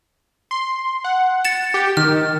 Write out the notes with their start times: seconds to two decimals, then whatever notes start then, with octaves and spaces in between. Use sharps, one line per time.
0.51 C6
1.04 F#5
1.45 A6 C#7 E7
1.74 G4
1.97 D#3 F6